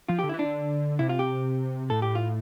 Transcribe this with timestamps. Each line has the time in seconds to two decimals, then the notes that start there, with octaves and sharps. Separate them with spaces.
0.08 F3 F4
0.19 G4
0.23 D3
0.29 E4
0.34 E3
0.39 D4
0.45 D3
0.99 C3 E4
1.09 F4
1.19 G4
1.90 A2 A4
2.02 G4
2.15 F4